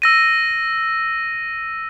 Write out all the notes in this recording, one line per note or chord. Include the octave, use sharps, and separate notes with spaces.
E6 A#6 D#7